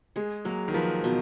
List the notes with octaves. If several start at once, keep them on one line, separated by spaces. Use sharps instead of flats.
G#3 G#4
F#3 A#3
D#3
F3 B4
B2 F3